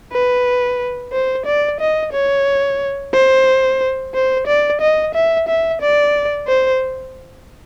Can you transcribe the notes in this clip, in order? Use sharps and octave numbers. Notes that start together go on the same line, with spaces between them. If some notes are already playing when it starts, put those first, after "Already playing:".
B4
C5
D5
D#5
C#5
C5
C5
D5
D#5
E5
E5
D5
C5